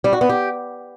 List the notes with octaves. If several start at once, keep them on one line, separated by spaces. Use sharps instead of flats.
G3
F#4
B3
G4